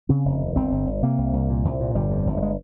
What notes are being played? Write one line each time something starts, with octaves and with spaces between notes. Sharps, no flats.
C#3 C4
F1
D#2
G1 C4
G1
G1
C3 A#3
C2
C2
A#2
C2
A#2
G1 G3
F2
G1
G3
G#3